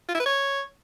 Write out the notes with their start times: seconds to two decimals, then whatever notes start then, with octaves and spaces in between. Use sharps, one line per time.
0.09 F4
0.14 E4
0.20 B4
0.26 C#5